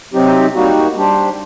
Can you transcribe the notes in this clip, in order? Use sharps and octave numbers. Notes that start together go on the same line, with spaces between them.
C3 F#3 C4 D#4 G4
G3 A#3 D#4 F#4
G3 D4 G4 C5